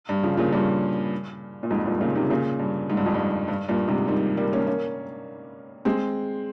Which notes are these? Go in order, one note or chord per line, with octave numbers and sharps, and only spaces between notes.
G2
C#3 F3
A#2 C#3
G2 A#2
A#2
F2 G#2
G2 A#2
A#2 C#3
C3 D#3
A#2 C#3
G2
G#2
G2
F2
G2
G2
G2 A#2
G#2 C3
D#3 G3
G3 A#3
A#3 C#4
A#3 C#4
G#3 C4